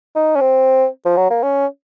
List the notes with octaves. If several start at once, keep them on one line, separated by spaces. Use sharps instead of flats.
D#4
C#4
C4
F3
F#3
A#3
C#4